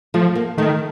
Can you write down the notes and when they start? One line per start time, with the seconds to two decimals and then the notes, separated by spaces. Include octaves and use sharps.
0.14 F3 A3
0.35 A#3
0.58 D#3 A3